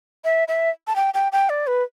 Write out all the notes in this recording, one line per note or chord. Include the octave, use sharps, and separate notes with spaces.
E5
E5
A5
G5
G5
G5
D5
B4